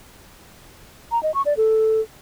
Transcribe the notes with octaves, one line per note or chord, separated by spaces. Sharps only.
A#5
D#5
C#6
D5
A4